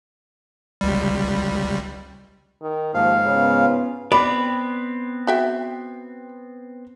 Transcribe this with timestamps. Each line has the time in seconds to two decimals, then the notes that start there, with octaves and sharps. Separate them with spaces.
0.81 C#2 G3
2.62 D#3
2.94 D#2 G#2 F3 F5
3.26 C#3 B3 C#4 F4
4.12 B3 C4 D5 B5
5.27 F#4 E5 G5